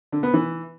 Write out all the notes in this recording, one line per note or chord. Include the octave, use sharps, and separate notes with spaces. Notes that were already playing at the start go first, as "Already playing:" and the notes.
D3
B3
E3